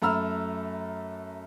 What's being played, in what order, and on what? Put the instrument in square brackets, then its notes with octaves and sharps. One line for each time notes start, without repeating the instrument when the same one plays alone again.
[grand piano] F#2 A3 A#5 B5 E6 F6